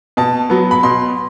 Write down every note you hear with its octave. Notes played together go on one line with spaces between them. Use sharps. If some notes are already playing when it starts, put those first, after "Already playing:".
B2 A5
F#3 B3
B5
B2 C6